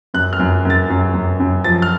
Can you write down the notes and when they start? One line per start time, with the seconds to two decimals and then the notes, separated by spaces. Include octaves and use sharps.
0.14 F#2 F#6
0.33 F6
0.40 F#2
0.65 F#2
0.70 A6
0.90 F#2
1.14 F#2
1.40 F#2
1.64 F3 A6
1.82 F6